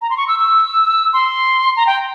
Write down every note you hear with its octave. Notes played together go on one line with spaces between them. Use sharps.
A#5
C6
C#6
E6
E6
C6
A#5
G5